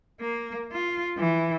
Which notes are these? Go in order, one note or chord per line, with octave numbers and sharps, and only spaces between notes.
A#3
F4
E3